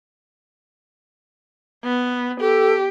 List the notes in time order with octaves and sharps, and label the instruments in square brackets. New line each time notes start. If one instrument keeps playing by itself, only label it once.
[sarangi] B3
[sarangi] G4 [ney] A4